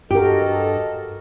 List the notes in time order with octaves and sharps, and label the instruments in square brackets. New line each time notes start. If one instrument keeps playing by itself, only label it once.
[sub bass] G2 [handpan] F#4 A#4 [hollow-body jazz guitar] G4 [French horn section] A4 D#5